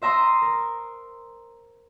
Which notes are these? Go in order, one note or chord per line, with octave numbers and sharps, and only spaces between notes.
C5 E5 A#5 C6 D#6
A#4